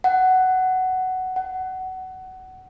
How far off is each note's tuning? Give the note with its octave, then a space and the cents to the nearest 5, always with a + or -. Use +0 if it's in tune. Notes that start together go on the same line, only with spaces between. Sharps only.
F#5 +10
F#5 +20